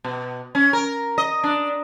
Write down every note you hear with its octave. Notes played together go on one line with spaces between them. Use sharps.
B2
C#4
A#4
D#5
D4